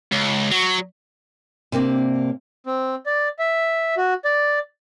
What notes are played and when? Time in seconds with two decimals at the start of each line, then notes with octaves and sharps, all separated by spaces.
0.12 C#2
0.51 F#3
1.72 C3 A#3 C4 D4
2.66 C4
3.06 D5
3.39 E5
3.97 F#4
4.25 D5